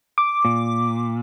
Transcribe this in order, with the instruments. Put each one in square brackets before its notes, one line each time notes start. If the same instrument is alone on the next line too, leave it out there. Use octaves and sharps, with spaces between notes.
[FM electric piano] D6
[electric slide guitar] A#2